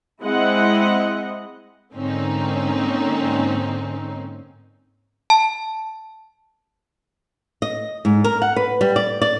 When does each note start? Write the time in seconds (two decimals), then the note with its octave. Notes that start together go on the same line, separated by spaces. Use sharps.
0.22 G#3 C4 E4 D#5 F#5
1.94 G#2 D3 A#3 C4 C#4 D#4
5.30 A5
7.62 D#5
8.05 G#2
8.24 A#4
8.42 F#5
8.56 B4
8.81 G3
8.96 D5
9.22 D5